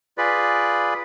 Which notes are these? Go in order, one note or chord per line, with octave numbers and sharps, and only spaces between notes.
F4 G#4 B4 D5 B5